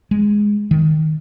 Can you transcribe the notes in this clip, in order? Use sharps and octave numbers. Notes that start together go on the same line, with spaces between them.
G#3
D#3